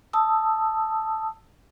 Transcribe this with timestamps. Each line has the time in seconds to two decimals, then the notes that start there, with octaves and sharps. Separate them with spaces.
0.13 A5 D#6 E6